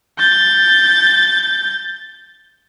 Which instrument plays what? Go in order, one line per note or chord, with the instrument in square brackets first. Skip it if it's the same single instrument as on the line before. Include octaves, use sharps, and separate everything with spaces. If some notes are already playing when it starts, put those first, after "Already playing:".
[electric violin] G6 A6